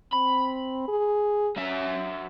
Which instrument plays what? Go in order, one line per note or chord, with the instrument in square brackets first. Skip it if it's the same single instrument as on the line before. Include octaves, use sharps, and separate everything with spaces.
[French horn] C4 [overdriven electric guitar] B5
[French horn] G#4
[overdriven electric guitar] F#3 E5 [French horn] C#4